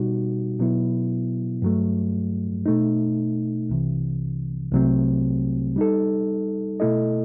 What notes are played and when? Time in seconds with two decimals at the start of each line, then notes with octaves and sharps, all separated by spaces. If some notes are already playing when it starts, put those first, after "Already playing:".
Already playing: B2 G3 D#4 F#4
0.59 B2 F#3 B3 E4
1.62 G2 F#3 A3
2.66 B2 A3 D#4
3.69 C2 C3 E3
4.73 C2 C3 F#3 A3 C4
5.76 G3 D#4 A4
6.80 B2 A3 E4 A4 D#5